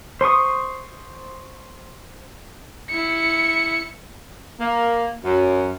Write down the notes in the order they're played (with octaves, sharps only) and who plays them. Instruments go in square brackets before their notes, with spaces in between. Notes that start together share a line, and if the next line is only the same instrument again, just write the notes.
[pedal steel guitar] C5 C6 C#6 D#6
[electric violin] E4 C#7
[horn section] A#3
F#2